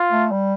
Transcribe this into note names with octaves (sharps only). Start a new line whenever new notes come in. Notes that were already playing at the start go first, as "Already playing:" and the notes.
Already playing: F4
A3
G3